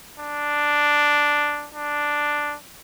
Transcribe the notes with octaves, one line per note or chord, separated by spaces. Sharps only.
D4
D4